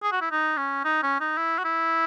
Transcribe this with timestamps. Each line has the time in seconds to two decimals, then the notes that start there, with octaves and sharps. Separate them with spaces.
0.03 G#4
0.12 F#4
0.21 E4
0.31 D#4
0.57 C#4
0.85 D#4
1.02 C#4
1.20 D#4
1.37 E4
1.59 F#4
1.64 E4